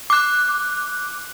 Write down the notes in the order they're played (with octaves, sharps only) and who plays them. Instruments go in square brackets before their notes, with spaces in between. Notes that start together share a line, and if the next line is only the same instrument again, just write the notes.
[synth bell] D6 F#6